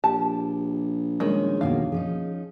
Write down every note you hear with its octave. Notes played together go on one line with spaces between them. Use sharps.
A#1 G4 A5
D#3 G3 G#3 C#4 D#4 G#4 C#5
D#2 B2 A#3 F5
F3 C#4 D#4 G#4